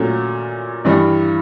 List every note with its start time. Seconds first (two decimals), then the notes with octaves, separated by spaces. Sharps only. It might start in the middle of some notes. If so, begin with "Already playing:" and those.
Already playing: A#2 F#3 A3 C#4
0.84 G2 E3 G3